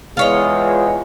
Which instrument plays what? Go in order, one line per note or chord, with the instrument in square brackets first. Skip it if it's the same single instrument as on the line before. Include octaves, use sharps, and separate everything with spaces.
[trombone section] E2 G#3 [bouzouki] F4 C#5 D#5